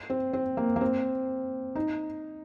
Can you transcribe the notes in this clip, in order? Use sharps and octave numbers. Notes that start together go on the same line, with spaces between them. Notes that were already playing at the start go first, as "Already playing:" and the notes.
C4
C4
A#3
A#3
C4
D#4